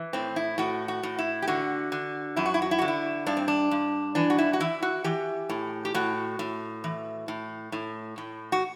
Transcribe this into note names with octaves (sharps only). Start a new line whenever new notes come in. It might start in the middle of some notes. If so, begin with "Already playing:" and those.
Already playing: E3
A2 C4
E4
A2 F#4
F#4
A2
E4
G4
D3 F#4
D3
F#2 E4
F#4
E4
F#4
E4
D3 F#4
E4
G2 D4
C4
D4
G2
E3 D4
F#4
E4
F#4
E3 E4
F#4
E3 G4
A2
G4
A2 F#4
A2
E3
A2
A2
A2
F#4